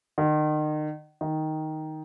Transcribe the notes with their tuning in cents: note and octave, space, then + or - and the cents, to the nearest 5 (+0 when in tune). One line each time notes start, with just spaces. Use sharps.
D#3 -35
D#3 +5